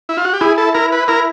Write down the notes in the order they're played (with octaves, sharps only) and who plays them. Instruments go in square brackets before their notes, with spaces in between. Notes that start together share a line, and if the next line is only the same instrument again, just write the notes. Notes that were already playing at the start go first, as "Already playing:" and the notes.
[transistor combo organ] E4
F4
F#4
G4
[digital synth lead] E4 [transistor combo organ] G#4
[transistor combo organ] A4
[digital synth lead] E4 [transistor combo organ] A#4
[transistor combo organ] B4
[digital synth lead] E4 [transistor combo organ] A#4